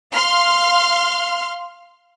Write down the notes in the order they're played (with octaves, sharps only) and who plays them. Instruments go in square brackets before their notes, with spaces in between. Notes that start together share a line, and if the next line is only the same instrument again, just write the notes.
[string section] F5 C6 F6